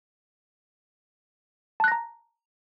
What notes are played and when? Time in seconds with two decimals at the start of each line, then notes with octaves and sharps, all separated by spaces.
1.80 A5
1.84 F#6
1.88 A#6
1.92 A#5